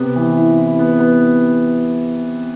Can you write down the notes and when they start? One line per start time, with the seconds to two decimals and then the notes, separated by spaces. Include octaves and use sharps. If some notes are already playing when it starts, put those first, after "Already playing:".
Already playing: C3 B3
0.15 E3
0.37 E4
0.58 E4
0.79 B3
0.99 B3